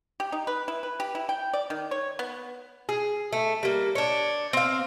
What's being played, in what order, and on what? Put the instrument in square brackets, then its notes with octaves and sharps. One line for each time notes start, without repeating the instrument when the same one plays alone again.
[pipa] G4
D#4
B4
E4
B4
G4
E4
G5
D5
D#3
C#5
B3
[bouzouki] G#4
A3
G3 A#3
D4 C#5
C4 F5